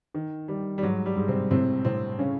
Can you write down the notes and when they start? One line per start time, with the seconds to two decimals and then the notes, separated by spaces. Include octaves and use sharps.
0.14 D#3
0.48 D#3 G3
0.78 G3
0.82 G#2 F#3
1.06 G3
1.17 G#2
1.28 C3 C4
1.51 A2 C3 C4
1.85 A2 C3 C4
2.19 C#3 C#4